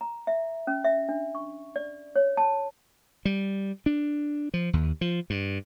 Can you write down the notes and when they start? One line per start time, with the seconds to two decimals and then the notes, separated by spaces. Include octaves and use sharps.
0.01 A#5
0.27 E5
0.67 C#4
0.84 E5
1.09 D4
1.35 C#6
1.76 D5
2.16 C#5
2.37 A5
3.25 G3
3.86 D4
4.54 F3
4.73 D#2
5.01 F3
5.30 G2